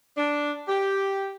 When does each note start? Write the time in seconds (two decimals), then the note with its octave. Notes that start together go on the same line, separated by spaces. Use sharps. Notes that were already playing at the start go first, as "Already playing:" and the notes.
0.17 D4
0.68 G4